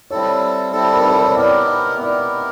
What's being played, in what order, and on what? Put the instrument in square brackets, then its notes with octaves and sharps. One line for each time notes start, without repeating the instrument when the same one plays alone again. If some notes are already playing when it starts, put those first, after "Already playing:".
[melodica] G3 C4 E4 A4 [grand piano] C#5
[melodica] G3 C4 E4 A4
[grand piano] A#4
B4
C5
C#5
[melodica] B3 E4 G4 A#4 [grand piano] D5
[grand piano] D#5
[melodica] B3 E4 G4 A#4 [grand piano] D5